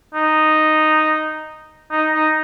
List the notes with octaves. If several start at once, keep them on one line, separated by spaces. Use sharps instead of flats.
D#4
D#4
D#4